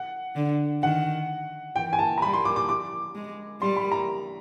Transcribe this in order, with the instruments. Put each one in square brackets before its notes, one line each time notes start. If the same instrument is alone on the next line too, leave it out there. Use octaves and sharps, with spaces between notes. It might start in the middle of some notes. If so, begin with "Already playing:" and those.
Already playing: [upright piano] F#5
[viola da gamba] D3
[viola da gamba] D#3 [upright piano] F#5
[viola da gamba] E3 [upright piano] G5
[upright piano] G#5
A5
A#5
[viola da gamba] G3 [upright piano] B5
[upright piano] C6
D6
D6
D6
[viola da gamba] G#3
[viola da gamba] G3 [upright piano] C6
[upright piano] B5
A#5